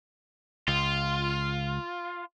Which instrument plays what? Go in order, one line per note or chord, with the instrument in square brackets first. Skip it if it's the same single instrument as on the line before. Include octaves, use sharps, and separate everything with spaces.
[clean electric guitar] C#2 [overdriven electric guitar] F4